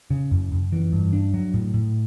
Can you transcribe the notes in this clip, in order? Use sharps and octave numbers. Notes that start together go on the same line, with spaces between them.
C#3
F#2
F#2
E3
G2
D4
F#3
A2
A2